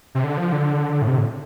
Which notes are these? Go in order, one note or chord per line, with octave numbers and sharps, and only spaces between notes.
C3
D3
F3
D3
A2
C3
A2